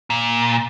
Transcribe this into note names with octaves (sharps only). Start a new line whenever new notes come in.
A#2